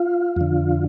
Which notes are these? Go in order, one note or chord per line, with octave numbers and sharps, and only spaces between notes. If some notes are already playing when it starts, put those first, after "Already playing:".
Already playing: F4
F2 D3